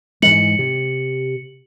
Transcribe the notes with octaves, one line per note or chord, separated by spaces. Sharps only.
G#2 E3 G#3 C#7 F#7
C3